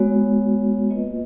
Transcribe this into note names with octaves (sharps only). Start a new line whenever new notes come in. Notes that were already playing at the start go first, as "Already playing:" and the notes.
Already playing: G#3 B3 F#4 C#5
A#3 F4 B4 D#5